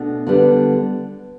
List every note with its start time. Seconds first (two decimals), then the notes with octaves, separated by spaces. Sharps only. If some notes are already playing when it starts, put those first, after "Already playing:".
Already playing: B2 A3 D4
0.27 D3 G3 B3